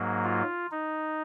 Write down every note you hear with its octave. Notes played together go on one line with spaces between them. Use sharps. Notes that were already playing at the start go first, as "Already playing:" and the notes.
Already playing: G#2 F#3 A#3
F4
D#4